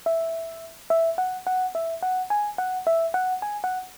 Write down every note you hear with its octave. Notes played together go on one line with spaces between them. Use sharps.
E5
E5
F#5
F#5
E5
F#5
G#5
F#5
E5
F#5
G#5
F#5